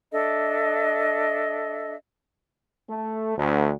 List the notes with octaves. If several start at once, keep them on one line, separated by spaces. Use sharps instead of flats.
D4 A4 D#5 E5
A3
D2